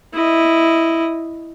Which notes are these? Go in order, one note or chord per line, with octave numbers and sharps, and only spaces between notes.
E4 D#5